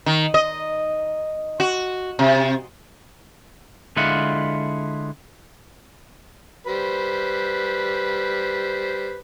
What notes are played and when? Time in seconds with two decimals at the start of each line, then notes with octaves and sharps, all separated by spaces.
0.06 D#3
0.34 D#5
1.60 F#4
2.19 C3
3.97 D3 G#3 E4 F4 F#5
6.67 G3 B4 C5